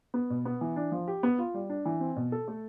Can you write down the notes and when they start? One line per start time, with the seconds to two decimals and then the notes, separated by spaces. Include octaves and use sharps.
0.14 B3
0.30 B2
0.45 B3
0.61 E3
0.76 D4
0.92 F3
1.08 G4
1.23 B3
1.38 F4
1.54 G3
1.70 D4
1.86 E3
2.00 C4
2.16 B2
2.32 A4
2.48 A3